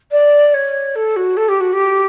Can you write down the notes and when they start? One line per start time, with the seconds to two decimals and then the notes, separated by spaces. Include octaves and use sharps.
0.11 D5
0.54 C#5
0.96 A4
1.16 F#4
1.37 A4
1.49 G4
1.61 F#4
1.73 G4